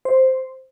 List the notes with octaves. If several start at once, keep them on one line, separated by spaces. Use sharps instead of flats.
C5